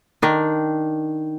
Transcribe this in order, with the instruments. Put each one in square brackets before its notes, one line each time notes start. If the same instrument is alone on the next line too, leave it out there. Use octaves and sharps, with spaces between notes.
[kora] D#3 D4